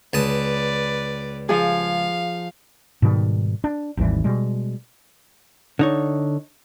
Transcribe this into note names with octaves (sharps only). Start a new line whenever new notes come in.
C#2 B4 D5 A5 D#6
F3 G#4 F5
G#2 B2 D#3 G3
D4
G#1 D#2 E3 G3
B2 G3 G#3
D3 D#4 C#5